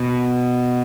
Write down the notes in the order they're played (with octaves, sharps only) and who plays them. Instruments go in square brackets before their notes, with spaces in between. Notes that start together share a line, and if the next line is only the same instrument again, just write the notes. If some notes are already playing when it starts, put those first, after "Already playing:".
Already playing: [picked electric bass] B2